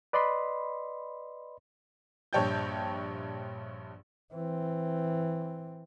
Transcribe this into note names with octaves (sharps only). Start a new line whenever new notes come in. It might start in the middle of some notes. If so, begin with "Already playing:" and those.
B4 D5 D#5 B5 C6
A#1 G2 C#5 G5 A5 G6
E3 C4